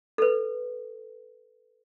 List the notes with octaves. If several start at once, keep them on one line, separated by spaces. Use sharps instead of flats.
A4 B4